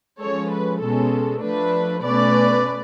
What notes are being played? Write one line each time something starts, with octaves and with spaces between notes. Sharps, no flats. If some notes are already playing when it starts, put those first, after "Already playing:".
F3 G#3 C#4 A4 C#5
B4
B2 G#3 C#4 A4
F3 A3 D4 B4
B2 A3 C#4 B4 D5